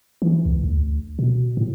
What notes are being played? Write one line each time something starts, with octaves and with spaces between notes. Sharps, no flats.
E3
C#2
D2
B2
A2